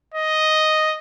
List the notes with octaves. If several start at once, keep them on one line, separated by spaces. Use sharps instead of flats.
D#5